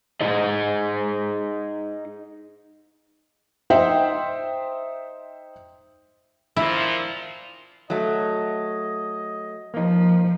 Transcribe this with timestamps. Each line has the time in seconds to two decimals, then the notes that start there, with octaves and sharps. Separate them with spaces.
0.21 D#4 G#4 D#5
3.70 D#4 C5 E5 G5
6.56 A#2 F3 E4
7.90 F#3 A3 D#5
9.74 F3 A#3 D#4